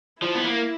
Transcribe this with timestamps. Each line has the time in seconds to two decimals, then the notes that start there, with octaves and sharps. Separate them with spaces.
0.22 F3 E4
0.35 B3
0.44 A#3